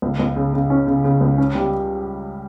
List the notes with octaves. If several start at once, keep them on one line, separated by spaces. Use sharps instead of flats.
C#2
C#2
C#3
C#3
C#4
C#3
C#3
C#2
C#4
G3